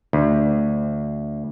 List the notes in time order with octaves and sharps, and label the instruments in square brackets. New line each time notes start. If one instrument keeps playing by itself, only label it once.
[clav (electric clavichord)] D2